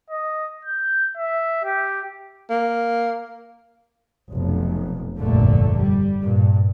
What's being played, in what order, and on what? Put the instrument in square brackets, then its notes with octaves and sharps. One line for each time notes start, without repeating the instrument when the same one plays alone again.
[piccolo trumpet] D#5
G6
E5
G4
[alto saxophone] A#3
[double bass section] F1 B1
F1 A#1 G2 A#2 D3 A3
G3
G2 A#2